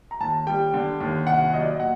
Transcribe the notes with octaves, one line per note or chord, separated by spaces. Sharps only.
A#5
D#2 A5
G3 G5
D3
D#2
C2 F#5
F#3 D#5
D5
D#5
A#2 F#5